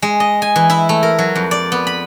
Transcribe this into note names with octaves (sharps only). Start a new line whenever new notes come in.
G#3
D#5
G#5
E3
E4
A3
A#4
F#3
F2
D5
B3
B5